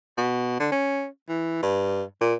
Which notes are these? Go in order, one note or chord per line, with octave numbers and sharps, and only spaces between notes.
B2
D3
C#4
E3
G2
A#2